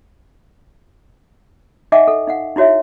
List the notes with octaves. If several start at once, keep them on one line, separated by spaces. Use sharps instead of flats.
D#4 D#5 E5 F#5 G#5 D6
A4
D#4 F5 F#5
D#4 E4 F#4 C#5 E5